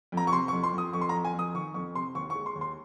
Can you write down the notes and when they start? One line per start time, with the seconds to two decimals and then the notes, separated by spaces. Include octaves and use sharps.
0.12 F2
0.17 A#5
0.27 C#6
0.33 C3 C6
0.48 C#6
0.53 F2
0.63 C6
0.73 F2
0.78 D#6
0.93 F2 C#6
1.01 C6
1.09 A#5
1.14 F2
1.25 G#5
1.34 F2
1.39 D#6
1.54 D#3 C#6
1.74 F2 C#6
1.95 C3 C6
2.15 D#2 C#6
2.30 C#6
2.35 G#3
2.46 C6
2.55 D#2
2.61 C6